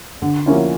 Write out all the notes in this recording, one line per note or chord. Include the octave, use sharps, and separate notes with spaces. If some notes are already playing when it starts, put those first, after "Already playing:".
D3
F3 A#3 C#4 E4